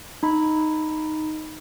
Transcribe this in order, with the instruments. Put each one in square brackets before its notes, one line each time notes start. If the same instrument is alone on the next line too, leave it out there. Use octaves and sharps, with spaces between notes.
[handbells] D#4 B5